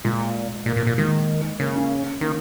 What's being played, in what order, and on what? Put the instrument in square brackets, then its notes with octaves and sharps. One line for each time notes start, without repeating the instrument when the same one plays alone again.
[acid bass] A#2 [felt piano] G#3
[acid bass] A#2 [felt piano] A#3
[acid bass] A#2
A#2
[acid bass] D#3 [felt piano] G#3
[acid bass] C#3 [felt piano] A#3
[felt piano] C#4
[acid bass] D#3 [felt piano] A#3